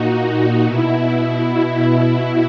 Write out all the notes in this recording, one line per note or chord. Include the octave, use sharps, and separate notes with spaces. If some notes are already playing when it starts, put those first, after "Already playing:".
Already playing: A#2 D#4 F#4
B2 E4